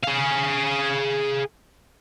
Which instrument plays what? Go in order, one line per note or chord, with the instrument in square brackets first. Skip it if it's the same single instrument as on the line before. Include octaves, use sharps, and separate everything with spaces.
[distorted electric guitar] G#4 F5